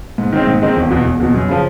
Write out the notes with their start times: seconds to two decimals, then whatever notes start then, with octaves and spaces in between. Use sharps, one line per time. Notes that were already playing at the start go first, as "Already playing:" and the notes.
0.18 G#2
0.32 D#3 G#3 C4 D#4
0.47 G#2
0.62 D#3 G#3 C4 D#4
0.76 E1
0.91 E2 B2
1.05 E1
1.20 E2 B2
1.34 F#2
1.49 C#3 F3